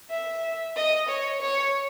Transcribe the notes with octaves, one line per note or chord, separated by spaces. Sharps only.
E5
D#5
C#5
C#5